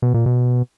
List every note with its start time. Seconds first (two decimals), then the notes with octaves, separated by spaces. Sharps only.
0.02 B2
0.14 A#2
0.26 B2